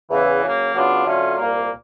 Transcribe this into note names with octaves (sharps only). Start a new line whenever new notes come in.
E2 C#3 E3
C#3 F#3 A#3
C#3 F#3 B3 D4 F4
D3 F#3 A3 C#4 F4
C2 A#2 G3 A#3